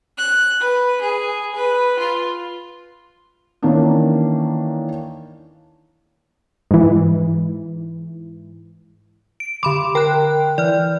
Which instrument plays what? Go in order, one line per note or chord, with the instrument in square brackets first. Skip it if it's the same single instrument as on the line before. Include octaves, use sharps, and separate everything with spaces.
[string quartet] F#6
B4
G#4
B4
F4
[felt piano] D#3 E3 A#3 C#4 D4
[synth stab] G#2 E3
[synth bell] D7
[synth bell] D3 B5 C6 [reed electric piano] D6
[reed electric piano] A#4 [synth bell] G5 F#6
[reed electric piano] E3 [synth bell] D5 F6